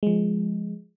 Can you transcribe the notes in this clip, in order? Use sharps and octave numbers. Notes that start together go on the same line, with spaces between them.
F3 G#3